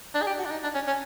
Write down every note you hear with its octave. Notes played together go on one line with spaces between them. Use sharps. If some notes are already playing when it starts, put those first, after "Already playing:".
D4
G#4
G4
F#4
D4
D#4
D4
C#4
C#4